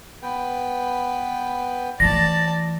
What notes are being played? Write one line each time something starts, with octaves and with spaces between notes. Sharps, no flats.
B3 B4 G5
E3 A3 D5 A5 A#6